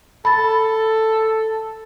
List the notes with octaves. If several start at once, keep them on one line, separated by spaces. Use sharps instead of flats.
A4 B5 A6